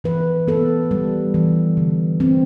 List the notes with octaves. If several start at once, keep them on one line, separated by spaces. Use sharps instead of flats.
E3 B4
B3 A4
G3
E3
D3
C4